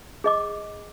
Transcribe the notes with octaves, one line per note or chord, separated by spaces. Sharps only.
G#4 D#5 D6